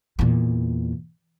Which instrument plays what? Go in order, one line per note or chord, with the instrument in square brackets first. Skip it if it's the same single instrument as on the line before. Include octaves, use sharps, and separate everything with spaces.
[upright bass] E2 A#2